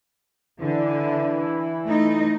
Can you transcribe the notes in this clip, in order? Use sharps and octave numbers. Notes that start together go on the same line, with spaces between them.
D3 E3 E4
A3 D#4